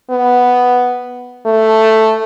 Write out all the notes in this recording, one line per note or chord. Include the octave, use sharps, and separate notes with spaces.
B3
A3